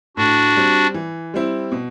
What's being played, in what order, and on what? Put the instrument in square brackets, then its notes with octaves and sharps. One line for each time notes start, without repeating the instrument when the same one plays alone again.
[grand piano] A2 [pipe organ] D4 F#4
[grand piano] G3 C4
E3
G3 C4 E4
B2